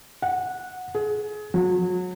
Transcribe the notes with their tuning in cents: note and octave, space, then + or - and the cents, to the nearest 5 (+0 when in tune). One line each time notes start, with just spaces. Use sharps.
F#5 -15
G#4 +25
F#3 -30